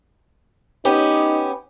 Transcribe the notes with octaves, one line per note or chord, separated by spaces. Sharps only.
B3 C#4 D#4 G4